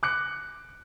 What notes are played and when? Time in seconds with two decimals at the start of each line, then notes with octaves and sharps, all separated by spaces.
0.03 D6 F#6 C#7